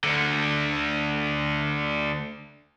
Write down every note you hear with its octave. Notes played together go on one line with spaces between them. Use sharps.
D2 D3